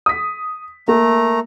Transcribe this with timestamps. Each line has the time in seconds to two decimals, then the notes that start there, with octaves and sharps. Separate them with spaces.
0.06 D#6 B6
0.88 A3 A#3 A#5